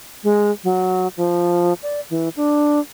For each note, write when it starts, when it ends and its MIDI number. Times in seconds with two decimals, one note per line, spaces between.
0.24 0.51 56
0.64 1.08 54
1.17 1.73 53
1.82 2.00 74
2.10 2.29 52
2.36 2.80 62